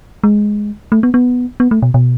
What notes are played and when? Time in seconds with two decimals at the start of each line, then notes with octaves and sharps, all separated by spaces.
0.24 G#3
0.92 A3
1.03 B3
1.14 B3
1.60 B3
1.71 A3
1.82 B2
1.94 B2